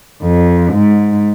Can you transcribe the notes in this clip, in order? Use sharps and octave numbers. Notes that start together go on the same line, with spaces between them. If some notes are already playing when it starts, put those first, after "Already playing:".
F2
G#2